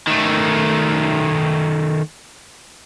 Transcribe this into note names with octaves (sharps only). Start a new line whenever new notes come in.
D#3 A3